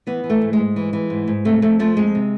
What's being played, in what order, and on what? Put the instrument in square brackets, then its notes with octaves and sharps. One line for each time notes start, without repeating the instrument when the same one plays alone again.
[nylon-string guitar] E3 B3
E3
A3
G#2
G#3
G#2
E3
E3
G#2
G#2
C3 A3
F2 A3
F3 A3
F2 G#3
C3